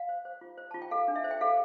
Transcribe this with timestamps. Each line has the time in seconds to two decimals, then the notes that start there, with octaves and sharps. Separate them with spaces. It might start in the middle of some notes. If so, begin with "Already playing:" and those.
Already playing: F5
0.09 C5
0.25 C5
0.41 F4
0.58 C5
0.71 F4 A5
0.82 G5
0.91 A4 F5
1.08 D4
1.16 E5
1.24 C5
1.31 G5
1.41 A4 F5